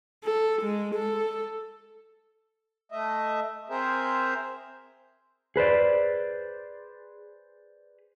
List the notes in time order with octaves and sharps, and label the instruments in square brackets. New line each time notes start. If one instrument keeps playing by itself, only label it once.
[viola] A4
G#3
A4
[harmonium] A3 D#5 E5
C4 G#4 A#4 C5 E5
[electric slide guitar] G#4 B4 C5 D5